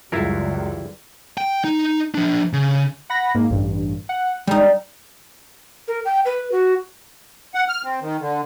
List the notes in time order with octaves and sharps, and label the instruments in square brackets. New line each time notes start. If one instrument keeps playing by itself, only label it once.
[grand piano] C#2 F#2 [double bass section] C#3 E3 G3 [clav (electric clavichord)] E4 F4 A#4
[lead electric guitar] G5
D#4
F3 D4
C#3
[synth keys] F#5 B5 A#6
G#2 A#3
A1 G2
F#5
[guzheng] G3 D#4 [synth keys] G#3
[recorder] A#4
G5
B4
F#4
[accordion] F#5
F6
C4
D#3
D3